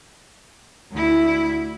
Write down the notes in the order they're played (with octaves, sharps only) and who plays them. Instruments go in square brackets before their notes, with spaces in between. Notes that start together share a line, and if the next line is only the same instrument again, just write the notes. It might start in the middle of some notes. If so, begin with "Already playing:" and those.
[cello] D2 E4